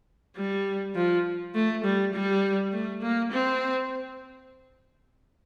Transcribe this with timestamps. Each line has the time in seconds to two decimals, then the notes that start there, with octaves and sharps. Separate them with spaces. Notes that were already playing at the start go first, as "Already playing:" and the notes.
0.37 G3
0.96 F3
1.55 A3
1.84 G3
2.14 G3
2.73 A3
3.02 A#3
3.32 C4